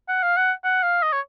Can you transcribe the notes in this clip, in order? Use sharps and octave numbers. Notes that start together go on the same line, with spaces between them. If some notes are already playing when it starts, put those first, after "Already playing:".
F#5
F5
F#5
F#5
F5
D#5
C#5